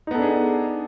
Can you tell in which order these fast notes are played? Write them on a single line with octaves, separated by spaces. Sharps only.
D#4 B3 A4 D4 G#4